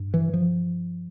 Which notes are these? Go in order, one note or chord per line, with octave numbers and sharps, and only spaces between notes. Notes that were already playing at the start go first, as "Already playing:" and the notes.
Already playing: G2
E3
F3